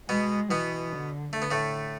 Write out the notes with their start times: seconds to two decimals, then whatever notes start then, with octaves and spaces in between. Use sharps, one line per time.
0.09 B2 G#3 B3
0.51 B2 E3 B3
0.92 D3
1.32 D3 A3
1.42 B3
1.51 A2 A3